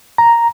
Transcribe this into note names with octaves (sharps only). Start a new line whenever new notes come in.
A#5